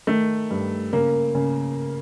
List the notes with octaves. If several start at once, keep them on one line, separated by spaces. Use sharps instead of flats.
D#3 A3
G2
C#3 A#3
C#3